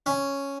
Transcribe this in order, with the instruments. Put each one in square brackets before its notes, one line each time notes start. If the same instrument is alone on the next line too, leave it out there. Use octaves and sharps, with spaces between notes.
[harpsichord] C#4